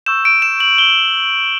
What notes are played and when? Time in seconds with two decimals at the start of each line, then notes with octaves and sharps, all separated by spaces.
0.06 C#6 E6 G6 E7
0.25 D7
0.42 E7
0.60 F#7
0.78 G7